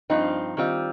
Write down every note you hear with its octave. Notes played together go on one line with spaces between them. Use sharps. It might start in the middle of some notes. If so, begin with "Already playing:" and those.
G2 F3 C4 D#4
D#3 G3 C4 F4